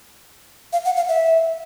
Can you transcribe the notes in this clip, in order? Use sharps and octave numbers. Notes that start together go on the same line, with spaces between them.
F5
F#5
F5
E5